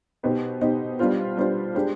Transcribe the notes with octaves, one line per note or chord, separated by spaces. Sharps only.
B2 B3 D#4 G4 C5
B2 B3 D#4 G4 C5
G3 B3 D4 F4 C5
G3 B3 D4 F4 C5
G#3 D4 G4 C5